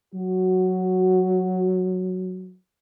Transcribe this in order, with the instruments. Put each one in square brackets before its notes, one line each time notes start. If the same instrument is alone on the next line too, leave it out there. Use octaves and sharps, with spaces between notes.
[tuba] F#3 [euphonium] F#4